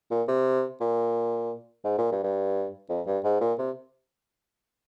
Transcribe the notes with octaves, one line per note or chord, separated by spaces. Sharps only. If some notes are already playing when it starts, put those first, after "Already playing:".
A#2
C3
A#2
G#2
A#2
G2
G2
F2
G2
G#2
A#2
C3